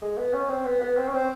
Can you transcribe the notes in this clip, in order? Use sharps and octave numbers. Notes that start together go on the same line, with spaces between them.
G#3
B3
C#4
C4
B3
B3
C4
C#4
C4